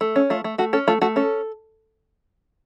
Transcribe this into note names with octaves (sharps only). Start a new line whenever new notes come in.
A3
C#4
A3 F4
A3
A3 F#4
C#4 A4
A3 F4
A3 F#4
C#4 A4